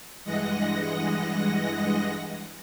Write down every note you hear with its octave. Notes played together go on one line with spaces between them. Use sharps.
G2 E3 G#3 D#5 F#5 A#6